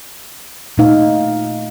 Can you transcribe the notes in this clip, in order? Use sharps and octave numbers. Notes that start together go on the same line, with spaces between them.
A#2 A3 D#4 F5